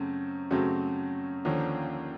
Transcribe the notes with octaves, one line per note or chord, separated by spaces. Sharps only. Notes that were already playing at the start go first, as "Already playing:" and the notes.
Already playing: F#2 C#3 F#3 A3 C4
F#2 C#3 F#3 A3 C4
D#2 D3 F3 A#3 C#4